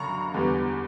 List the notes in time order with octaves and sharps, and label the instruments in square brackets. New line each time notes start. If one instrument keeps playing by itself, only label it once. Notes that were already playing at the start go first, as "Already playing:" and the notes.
Already playing: [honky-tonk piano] F#2 D3 A#3 A#5 B5 C#6
E2 D3 G3 B3